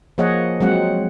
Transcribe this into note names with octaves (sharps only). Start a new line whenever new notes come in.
F3 A#3 G#4 C#5 D#5 F#5
F#3 G#3 C4 F#5